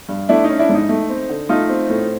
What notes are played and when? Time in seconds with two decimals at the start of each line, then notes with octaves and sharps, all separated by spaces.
0.09 G2
0.29 A3 D4 E4
0.44 D#4
0.49 C#4
0.59 D4 E4
0.69 G#2 D#4
0.89 A3
1.10 C4
1.30 D3
1.49 A3 D#4 F4
1.69 C4
1.90 A2